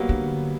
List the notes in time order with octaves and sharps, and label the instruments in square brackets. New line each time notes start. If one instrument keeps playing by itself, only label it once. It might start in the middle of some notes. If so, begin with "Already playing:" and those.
Already playing: [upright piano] F#3 G3 A#3 B3
[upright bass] D3